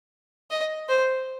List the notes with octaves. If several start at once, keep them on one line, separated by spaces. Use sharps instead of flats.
D#5
C5